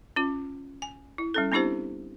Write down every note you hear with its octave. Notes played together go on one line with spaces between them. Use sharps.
C#4 F4
G#5
E4
G3 C#4 A4
B3 C4 D4 E4 G4 C5